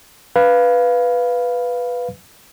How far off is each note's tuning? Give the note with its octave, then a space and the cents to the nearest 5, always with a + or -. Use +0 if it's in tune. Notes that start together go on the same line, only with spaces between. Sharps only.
B4 +0 F5 +0